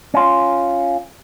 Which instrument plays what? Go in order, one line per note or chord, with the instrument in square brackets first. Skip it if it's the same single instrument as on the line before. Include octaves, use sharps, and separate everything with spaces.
[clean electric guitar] C#4 F4